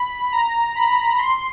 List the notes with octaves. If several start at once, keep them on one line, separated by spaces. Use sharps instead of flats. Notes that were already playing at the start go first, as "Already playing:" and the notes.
Already playing: B5
A#5
B5
C6